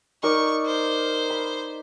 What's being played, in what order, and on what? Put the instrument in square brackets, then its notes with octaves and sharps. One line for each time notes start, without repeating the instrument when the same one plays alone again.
[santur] D#4 A#4 D5 [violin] C#6
[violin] C5
[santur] B5